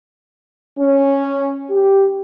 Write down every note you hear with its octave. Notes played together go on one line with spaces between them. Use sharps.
C#4
G4